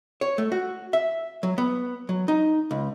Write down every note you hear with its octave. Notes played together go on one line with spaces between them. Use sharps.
C#5
A3
F#4
E5
F#3
B3
F#3
D#4
C#2